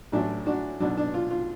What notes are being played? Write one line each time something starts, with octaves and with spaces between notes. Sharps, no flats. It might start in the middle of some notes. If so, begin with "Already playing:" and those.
A1 A2 F#3 A3 D4
D4 F#4
B1 B2 F#3 D4
D4
F4
F4